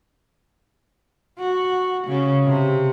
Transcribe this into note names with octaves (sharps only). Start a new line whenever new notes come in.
F#4
C#3
C3